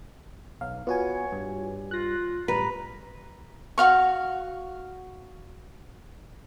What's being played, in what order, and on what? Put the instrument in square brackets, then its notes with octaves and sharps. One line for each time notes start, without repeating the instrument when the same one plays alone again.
[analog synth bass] B1 [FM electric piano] F5
[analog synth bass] B3 [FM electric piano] F4 F#4 G#5 [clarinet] C#5
[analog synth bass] G2
[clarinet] F4 [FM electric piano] F#6 A#6
[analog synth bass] F#1 [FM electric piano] A2 G3 [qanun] B4 [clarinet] A#5
[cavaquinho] F#4 F5 C#6